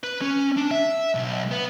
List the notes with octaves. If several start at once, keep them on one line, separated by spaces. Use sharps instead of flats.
B4
C#4
D4
E5
B1
B3